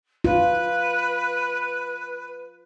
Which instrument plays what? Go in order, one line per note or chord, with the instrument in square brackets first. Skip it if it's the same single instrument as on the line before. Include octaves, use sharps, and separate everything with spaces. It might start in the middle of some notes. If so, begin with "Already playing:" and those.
[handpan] F4 [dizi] B4